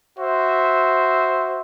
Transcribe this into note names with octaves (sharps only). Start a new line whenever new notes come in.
F#4 C5 E5